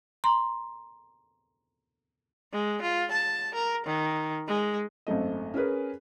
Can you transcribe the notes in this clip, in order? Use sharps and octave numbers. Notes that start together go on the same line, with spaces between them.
A#5 C6
G#3
F4
A5
A#4
D#3
G#3
G#1 F#2 A3 D#5
C#4 G#4 A#4 B4